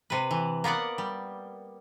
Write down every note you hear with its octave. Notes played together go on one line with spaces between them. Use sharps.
C3 B4
E3
A#3 B3 D5 F#5
G3